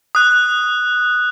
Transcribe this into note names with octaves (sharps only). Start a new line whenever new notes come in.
D#6 F#6